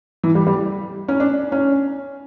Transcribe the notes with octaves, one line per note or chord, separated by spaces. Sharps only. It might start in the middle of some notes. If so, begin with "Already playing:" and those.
E3
G3
G3
C#4
D4
C#4